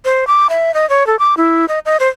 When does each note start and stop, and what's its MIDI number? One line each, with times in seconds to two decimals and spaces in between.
0.05 0.27 72
0.27 0.47 86
0.50 0.74 76
0.74 0.88 75
0.90 1.06 73
1.07 1.19 69
1.19 1.35 86
1.37 1.66 64
1.68 1.79 75
1.86 1.97 75
2.00 2.08 72